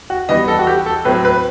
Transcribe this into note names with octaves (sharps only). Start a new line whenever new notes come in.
F#4
E3 G3 B3 D#5
A4
F#4
G4
A4
A2 F#3 C4 B4
B4